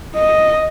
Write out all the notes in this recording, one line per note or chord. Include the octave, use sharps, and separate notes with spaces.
D#5